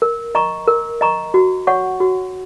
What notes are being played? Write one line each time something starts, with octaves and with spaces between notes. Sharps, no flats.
A#4
D#5 A#5 C#6
A#4
D#5 A#5 C#6
F#4
C#5 F#5 C#6
F#4